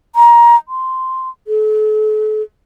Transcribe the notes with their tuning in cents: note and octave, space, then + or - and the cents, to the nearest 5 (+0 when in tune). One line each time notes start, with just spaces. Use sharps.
A#5 +20
C6 -5
A4 -40